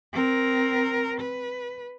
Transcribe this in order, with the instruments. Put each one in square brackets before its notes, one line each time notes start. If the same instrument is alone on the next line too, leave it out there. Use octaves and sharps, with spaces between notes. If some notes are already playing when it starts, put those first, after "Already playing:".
[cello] C4 A#4
B4